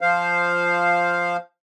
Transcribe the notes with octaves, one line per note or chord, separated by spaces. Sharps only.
F3 C5 F5